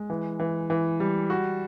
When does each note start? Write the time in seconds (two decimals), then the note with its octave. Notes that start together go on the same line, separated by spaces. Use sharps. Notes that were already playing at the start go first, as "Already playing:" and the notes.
Already playing: G#3
0.10 E3
0.40 E3
0.70 E3
1.00 G3
1.30 F#4